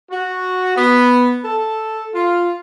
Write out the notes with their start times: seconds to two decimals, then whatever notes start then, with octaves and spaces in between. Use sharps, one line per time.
0.11 F#4
0.77 B3
1.44 A4
2.14 F4